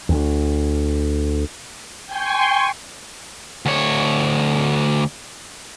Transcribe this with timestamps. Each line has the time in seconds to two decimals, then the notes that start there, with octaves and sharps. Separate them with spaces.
0.09 D2
2.06 G5 G#5 C6 C#6
3.66 D2 C#5